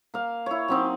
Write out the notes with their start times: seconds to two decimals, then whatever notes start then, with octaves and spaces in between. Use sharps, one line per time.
0.14 A#3 F5
0.46 E4 C#5
0.68 F#3 C4 D#4